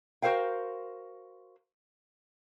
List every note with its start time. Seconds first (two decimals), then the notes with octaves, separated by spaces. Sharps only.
0.22 F#4 A#4 C5 F5 G5